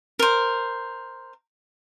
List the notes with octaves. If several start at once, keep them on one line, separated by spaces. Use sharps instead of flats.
A#4 C5